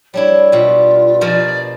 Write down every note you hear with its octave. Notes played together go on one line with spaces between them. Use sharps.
G3 D4 E4 C#5
B2 G3 F4
B2 F3 A#4 D5